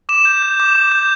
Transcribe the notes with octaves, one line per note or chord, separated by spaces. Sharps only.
D6 E7
G6
G6
D6
D6
G6